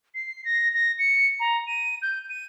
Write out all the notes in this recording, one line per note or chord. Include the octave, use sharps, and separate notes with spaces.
C7
A#6
A#6
C#7
A#5
D#7
G6
D#7